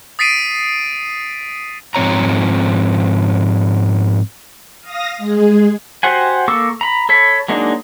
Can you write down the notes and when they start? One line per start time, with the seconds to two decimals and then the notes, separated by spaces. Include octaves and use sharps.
0.19 D#6 A6 B6 C7 D7 D#7
1.95 G#2 F3 C4 C#5 A#5
4.81 F5 D#6 A#6
5.18 G#3 G#4
6.03 F#4 G4 C5 F#5 G#5
6.48 A#3 A4 C#6 D6 E6
6.81 A#5 B5
7.09 A4 C#5 B5
7.49 F#3 G#3 A#3 D4 D#4